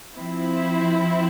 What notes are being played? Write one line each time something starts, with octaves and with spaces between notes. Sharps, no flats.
F3 C4 E4